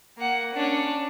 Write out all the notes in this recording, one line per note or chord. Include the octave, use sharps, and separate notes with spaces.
A#3 F#5
C#4 D4